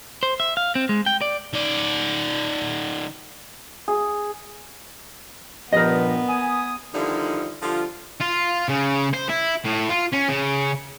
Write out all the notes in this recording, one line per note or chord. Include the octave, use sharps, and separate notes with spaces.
C5
E5
F5
C4
G#3
G5
D5
D#3 D5
G#4
G2 A#2 F3 B3 A#4 D#5
G#5 D#6
D3 D#3 F3 G3 D#4 E4
D3 F3 G3 F4
F4
C#3
C5
E4
A2
F4
C#4
C#3